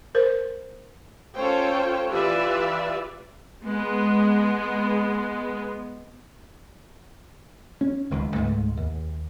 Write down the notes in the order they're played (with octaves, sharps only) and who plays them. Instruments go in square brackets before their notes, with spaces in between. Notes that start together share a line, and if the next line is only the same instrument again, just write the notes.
[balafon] A#4 C5
[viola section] C#4 F4 A4 C5 C#5 G5
E3 F4 G4 B4 D5 E5
G#3 B3
[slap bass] C#4
D1 C#2 D#3
C#2 G#2 A3
D#2